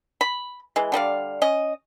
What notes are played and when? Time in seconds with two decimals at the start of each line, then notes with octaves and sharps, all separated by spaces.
0.21 B5
0.76 E3 G#3
0.92 D3 G3 D5 F5
1.42 C#4 D#5